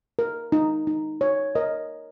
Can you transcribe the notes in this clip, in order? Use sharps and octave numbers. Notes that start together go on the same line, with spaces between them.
A#4
D#4
D#4
C#5
A#4 D#5